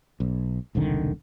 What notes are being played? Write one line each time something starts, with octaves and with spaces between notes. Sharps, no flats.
B1
E1 C2 D3 D#3